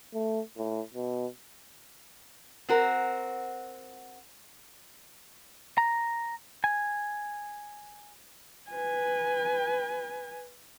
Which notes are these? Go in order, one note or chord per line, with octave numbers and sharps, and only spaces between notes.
A3
A2
B2
C4 F#4 A#4
A#5
G#5
B4 G#5